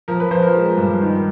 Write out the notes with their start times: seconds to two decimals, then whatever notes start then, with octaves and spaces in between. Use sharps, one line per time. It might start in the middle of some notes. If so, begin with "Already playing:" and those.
0.08 F3 A#4
0.20 B4
0.31 F3 C5
0.42 A#4
0.55 G#3
0.77 G2
1.02 D#3